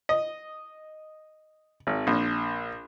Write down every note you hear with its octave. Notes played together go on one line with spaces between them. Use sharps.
D#5
G#1
A#1